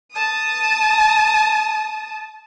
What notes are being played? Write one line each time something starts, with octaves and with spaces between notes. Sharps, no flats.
A5 D#6